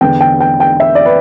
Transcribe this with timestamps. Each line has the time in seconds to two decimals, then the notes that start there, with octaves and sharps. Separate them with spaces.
0.01 E2 D3 G5
0.21 G5
0.40 G5
0.60 G5
0.80 E5
0.95 D5
1.06 B4